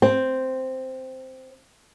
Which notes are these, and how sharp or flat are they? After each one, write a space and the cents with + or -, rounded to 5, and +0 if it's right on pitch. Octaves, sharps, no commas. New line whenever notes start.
C4 -5